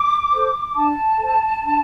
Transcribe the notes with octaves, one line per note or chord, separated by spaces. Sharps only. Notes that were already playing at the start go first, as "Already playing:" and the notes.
Already playing: D6
A4 C5
D4 A5
A4 C5
D4